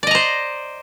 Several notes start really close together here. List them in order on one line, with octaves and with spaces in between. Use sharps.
D5 D#5 A#5 C5